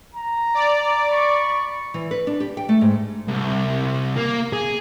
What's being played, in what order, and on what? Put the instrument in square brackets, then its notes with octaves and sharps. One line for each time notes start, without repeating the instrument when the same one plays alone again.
[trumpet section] A#5
[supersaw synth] D5
[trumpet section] B5 C#6
[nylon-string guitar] E3
B4
D4
G4
G5
A3
G#2
[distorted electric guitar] C2
A#3
G#4